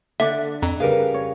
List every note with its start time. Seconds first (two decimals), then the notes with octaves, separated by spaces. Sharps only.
0.20 D3 D4 D5 E5
0.62 F2 A#5
0.80 C#3 G3 A#4 B4 F5
1.14 C#5